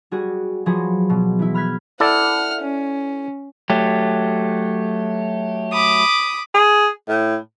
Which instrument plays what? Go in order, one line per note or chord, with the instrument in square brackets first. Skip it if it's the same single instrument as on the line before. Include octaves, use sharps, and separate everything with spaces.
[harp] G3 F#4 G#4
F3 F#3 F#4 G#4 B4
B2
E3 E4
B5 F6 F#6 G#6 B6
[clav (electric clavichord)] E4 A4 D5 [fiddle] F#5 F6
[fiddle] C#4
[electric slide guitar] F#3 A3 G4
[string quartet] B5 D6 D#6
[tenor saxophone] G#4
A2